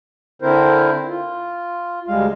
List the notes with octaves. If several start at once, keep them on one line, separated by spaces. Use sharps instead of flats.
D3 C4 E4 A#4 C5
F4
D2 G3 G#3 F5